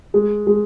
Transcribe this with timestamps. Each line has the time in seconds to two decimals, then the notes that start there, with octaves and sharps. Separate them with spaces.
0.14 G#3
0.47 G#3